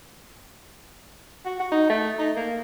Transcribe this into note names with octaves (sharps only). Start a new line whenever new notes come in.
F#4
F#4
D#4
A3
D#4
A#3